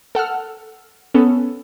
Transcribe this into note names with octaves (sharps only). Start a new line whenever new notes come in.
A4 F#5 E6 F6
B3 C#4 A4